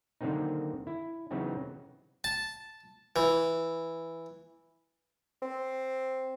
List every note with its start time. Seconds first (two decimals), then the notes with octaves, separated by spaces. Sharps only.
0.21 D3 D#3 F#3 A#3 C4 D#4
0.87 E4
1.31 C#3 E3 F#3 B3 C4 D#4
2.24 A5
3.16 E3
5.42 C4